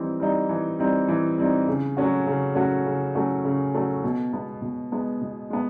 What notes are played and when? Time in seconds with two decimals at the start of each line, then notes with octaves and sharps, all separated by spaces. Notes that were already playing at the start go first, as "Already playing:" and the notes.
Already playing: E3 G3 C4 D#4
0.20 G3 C4 D#4
0.49 E3
0.79 G3 C4 D#4
1.08 E3
1.38 G3 C4 D#4
1.68 C#3
1.97 F#3 A3 C#4 F#4
2.27 C#3
2.55 F#3 A3 C#4 F#4
2.86 C#3
3.15 F#3 A3 C#4 F#4
3.44 C#3
3.74 F#3 A3 C#4 F#4
4.04 B2
4.33 G#3 B3
4.62 B2
4.92 G#3 B3
5.21 B2
5.50 G#3 B3